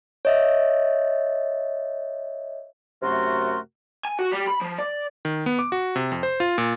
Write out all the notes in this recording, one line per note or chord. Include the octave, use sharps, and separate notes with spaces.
C#5 D#5 E5
F#2 C3 A3 F#4 A#4 C6
G#5
F#4
G3
B5
F3
D5
D#3
B3
D6
F#4
C3
F2
C5
F4
A#2